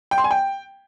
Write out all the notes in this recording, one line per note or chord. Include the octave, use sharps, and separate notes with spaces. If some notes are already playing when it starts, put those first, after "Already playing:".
G5
C6
G#5
G5